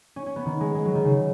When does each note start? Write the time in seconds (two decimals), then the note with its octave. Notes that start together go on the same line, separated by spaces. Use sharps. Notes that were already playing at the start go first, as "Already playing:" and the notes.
0.16 C#4
0.26 C#4
0.36 B3
0.46 D#3
0.61 G#3
0.75 G#3
0.85 F#3
0.95 D#3
1.05 C#3